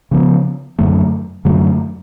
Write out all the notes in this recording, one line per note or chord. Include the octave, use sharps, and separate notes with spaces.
C#3 F3 B3
F#2 D3 F#3 A3
F#2 D3 F#3 A3